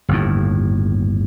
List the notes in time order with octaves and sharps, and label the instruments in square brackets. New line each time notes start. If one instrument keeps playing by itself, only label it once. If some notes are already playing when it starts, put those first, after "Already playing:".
[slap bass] G1 D#2 A2